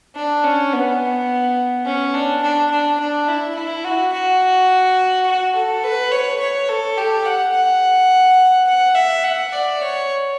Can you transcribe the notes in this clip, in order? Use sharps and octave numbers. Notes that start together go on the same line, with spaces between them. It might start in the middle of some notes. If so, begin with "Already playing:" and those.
D4
C#4
B3
C#4
D4
D4
D4
D4
E4
E4
F#4
F#4
F#4
A4
B4
C#5
C#5
A4
G4
F#5
F#5
F#5
E5
F#5
D5
C#5